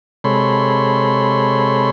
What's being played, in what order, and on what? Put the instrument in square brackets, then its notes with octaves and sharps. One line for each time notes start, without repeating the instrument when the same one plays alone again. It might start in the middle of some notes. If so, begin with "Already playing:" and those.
[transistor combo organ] C3 G#3 A4 C#5 B5 C6